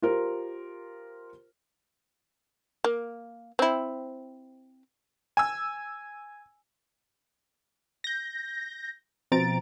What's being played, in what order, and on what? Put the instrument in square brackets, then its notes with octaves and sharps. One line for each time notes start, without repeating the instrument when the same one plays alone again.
[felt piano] F4 G4 A#4 C5
[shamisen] A#3
C4 E4
[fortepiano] G#5 E6
[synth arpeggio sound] G6 A#6
B2 F3 C4 A#5 A6 D7